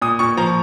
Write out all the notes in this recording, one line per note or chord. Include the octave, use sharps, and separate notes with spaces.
A#2 D#6
A#2 C#6
F3 A#5